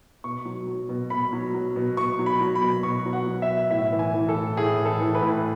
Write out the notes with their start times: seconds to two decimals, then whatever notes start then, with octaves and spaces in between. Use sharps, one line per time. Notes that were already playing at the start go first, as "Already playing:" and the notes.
0.24 B2 C#6
0.45 F#3
0.67 F#3
0.89 B2
1.10 B2 B5
1.33 F#3
1.54 F#3
1.76 B2
1.97 B2 C#6
2.19 F#3
2.26 B5
2.41 F#3
2.55 B5
2.62 B2
2.83 B2 C#6
3.05 F#3
3.13 F#5
3.27 F#3
3.42 E5
3.49 B2
3.70 A2 E5
3.92 E3
3.99 G#5
4.14 E3
4.29 A4
4.35 A2
4.57 A2 G#4
4.79 E3
4.85 A4
5.01 E3
5.15 B4
5.22 A2